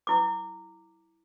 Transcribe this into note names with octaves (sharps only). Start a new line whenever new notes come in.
E4 D6